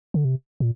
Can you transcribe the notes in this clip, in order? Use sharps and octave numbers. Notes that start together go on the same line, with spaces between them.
D3
C3
A#2